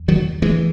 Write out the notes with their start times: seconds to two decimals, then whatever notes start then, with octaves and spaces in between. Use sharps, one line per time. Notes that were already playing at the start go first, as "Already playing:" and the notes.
Already playing: E2
0.08 D#3 F#3
0.42 E3 G#3